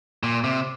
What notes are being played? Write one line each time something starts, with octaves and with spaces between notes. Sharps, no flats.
A#2
C3